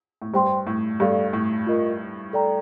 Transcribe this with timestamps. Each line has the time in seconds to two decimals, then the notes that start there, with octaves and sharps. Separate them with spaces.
0.22 A2
0.34 G2 C5 G5 C6
0.67 A2
1.00 G2 A4 D5 F5
1.33 A2
1.67 F4 A#4 D#5
2.33 A4 D5 G5 A#5